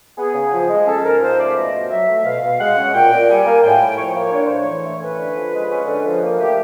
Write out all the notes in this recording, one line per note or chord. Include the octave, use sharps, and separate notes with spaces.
B3 G#4
C#3
F3
G#3
C#4 A4
G#2 A#4
F3 C5
A3 D5
E5
B2 D#5
B2
F#3 E5
A3
B2 F5
B2
G#3 F#5
C#4
A#2 G5
A#2
G3 G#5
A#3
A2 G5
A2
F3 C#5
A#3
D4 C#5
A2 C5
C#5
E3
A3
C#4 B4
D3
F3
G#3
C#4
D3
F3
A#3
A3 G4